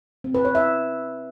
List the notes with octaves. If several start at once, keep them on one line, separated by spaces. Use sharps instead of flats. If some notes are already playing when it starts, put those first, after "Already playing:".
C4
B4
C#5
E5